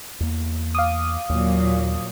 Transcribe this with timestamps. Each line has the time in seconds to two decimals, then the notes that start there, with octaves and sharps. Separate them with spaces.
0.20 E2 A#3
0.75 F5 D6 D#6
1.29 D#2 A#2 F#3